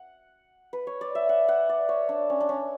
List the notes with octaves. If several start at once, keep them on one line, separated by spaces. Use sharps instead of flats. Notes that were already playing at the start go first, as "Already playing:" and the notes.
Already playing: F#5
B4
C#5
D5
E5
F#5
F#5
D5
C#5
D4
C#4
D4
C#4